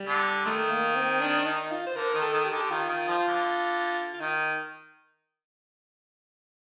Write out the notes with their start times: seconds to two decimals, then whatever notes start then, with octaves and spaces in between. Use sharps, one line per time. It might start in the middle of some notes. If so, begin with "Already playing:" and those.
Already playing: G3
0.08 D3
0.46 D#3 A3
0.70 A#3
0.96 C4
1.20 D4
1.46 D#4
1.71 F4
1.87 C5
1.96 D3 A#4
2.14 D#3
2.21 A4
2.33 D#3
2.45 G4
2.52 D3 A4
2.61 G4
2.71 D#3 F4
2.89 D#3
3.08 F3
3.28 D3
4.14 F4
4.20 D#3 D#4